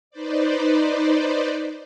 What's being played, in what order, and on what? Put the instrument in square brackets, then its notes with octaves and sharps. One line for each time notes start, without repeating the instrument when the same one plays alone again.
[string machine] D#4 B4 C5 D5